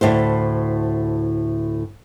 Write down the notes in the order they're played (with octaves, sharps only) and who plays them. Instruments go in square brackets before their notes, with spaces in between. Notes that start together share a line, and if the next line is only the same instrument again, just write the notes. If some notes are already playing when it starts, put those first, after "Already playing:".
[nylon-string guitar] D2 A2 E4 C5